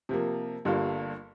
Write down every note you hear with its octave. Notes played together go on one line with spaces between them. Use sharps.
C3 F3 A#3
G1 G2 D3 A#3 F4